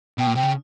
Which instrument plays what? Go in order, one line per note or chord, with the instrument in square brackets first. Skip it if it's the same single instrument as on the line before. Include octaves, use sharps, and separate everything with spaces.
[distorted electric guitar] B2 [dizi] G5
[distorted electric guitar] A#2
[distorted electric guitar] C3 [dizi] G5
[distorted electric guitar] C#3